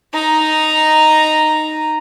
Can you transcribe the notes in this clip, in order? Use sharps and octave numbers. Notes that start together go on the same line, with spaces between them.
D#4 A#5